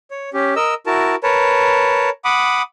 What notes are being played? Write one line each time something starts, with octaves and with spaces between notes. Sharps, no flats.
C#5
C#4 G4
A#4 D#5 E6
E4 F#4 A#4 A5
A#4 B4 C#5 A5
F#5 B5 D6 D#6